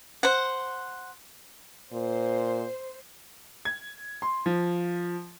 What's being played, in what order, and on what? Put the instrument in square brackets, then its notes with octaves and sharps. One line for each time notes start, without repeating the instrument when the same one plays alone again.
[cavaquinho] C5 F#5
[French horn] A#2 [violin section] C5
[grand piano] G#6
C6
F3